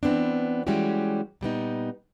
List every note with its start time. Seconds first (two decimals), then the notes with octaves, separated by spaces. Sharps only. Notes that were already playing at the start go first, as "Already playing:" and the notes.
0.03 E3 B3 C4 D4
0.67 E3 G3 G#3 C#4 F#4 G4
1.41 A#2 G3 B3 D#4